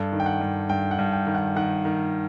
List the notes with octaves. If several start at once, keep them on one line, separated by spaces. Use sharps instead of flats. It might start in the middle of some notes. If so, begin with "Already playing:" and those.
Already playing: G2 A4
D#3
G5
F#5
G2
G2 G5
F#5
G2
G5
D#3
F#5
D#3 F#5
D#3